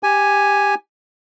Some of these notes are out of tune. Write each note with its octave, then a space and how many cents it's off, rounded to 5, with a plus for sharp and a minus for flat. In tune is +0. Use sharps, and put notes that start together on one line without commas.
G4 +10 G#5 +0